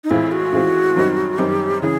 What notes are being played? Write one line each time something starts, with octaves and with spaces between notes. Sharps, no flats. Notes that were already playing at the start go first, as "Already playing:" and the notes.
D#4
A2 E3 G#3 C4 E4 F4
F#4
A2 E3 G#3 C4 F4
F#2 D#3 G3 C4 D#4
F#2 D#3 G3 C4 D#4 G4
C#3 E3 G#4